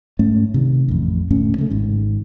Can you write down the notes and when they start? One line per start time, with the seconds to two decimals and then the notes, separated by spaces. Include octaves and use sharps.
0.19 G#2 A3 C#4
0.54 C3 D#3
0.88 A1 F2
1.30 E1 D2 A2 C#4
1.58 C#3 A3
1.70 G#1 G#2